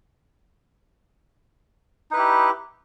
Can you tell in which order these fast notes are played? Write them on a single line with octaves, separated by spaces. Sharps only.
D#4 B4 E4 G4